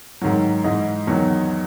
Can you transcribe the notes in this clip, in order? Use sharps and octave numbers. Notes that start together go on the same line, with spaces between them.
G#2 D#3 F#3
G#2 E3 D#5
E2 D#3 F#3